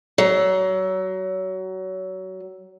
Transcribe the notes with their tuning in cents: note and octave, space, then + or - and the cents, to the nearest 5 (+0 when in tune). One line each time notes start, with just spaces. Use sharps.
F#3 +25